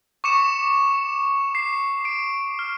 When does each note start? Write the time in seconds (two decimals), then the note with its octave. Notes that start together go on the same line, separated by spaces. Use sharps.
0.24 C#6 D6 C#7 E7
1.55 C7
2.05 D7
2.59 F6